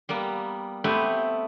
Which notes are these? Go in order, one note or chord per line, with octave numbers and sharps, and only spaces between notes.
G3 A#3 B3
A3 B3 C4 E4 G4 B4